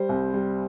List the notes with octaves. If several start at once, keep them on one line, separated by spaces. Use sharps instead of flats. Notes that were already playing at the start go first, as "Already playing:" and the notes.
Already playing: G3 C5
C2
G3